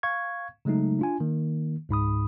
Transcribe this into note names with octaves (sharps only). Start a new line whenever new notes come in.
F5 C#6 G#6
C#3 F#3 G#3 A3 D#4
D4 F4 G#5
D#3 A#3
C#2 G#2 B5 D#6